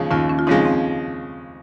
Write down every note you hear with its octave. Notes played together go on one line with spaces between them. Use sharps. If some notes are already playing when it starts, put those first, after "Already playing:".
Already playing: D#2 C#3 F3 G#3
D#2 C#4 F4
C#4
F4
C#3 F3 G#3 C4 D#4
C4